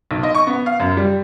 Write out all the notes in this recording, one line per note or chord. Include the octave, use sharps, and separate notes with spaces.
B1
D#5
C#6
B3
F5
F#2
G3